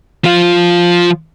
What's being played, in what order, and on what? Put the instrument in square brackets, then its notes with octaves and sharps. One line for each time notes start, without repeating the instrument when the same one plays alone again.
[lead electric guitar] F3 F4